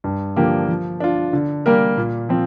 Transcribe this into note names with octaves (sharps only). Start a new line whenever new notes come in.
G2
D3 F3 A#3 G4
F3
D4 F4
D3
G3 A#3 G4 A#4
A#2
F3 C4